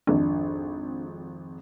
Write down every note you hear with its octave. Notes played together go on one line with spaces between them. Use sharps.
G#1 F2 D4